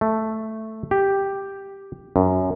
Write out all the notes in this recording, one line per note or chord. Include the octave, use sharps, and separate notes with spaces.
A3
G4
F#2